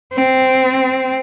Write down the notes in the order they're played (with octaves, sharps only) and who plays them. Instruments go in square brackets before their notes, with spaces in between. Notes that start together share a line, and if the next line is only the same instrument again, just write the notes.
[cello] C4